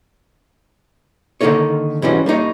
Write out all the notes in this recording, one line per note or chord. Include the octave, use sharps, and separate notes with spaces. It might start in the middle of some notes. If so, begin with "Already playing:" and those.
D3 D#3 A#3 D#4 A4 C#5
G#2 E3 G3 C#4 F#4
G3 A#3 D#4 C#5